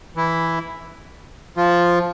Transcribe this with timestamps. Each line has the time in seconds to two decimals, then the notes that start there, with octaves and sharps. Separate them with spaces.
0.16 E3 E4
1.57 F3 F4